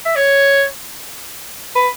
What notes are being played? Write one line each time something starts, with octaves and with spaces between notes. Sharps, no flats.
E5
C#5
B4